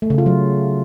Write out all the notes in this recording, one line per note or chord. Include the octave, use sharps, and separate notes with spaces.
A3
C#3
F4
F#3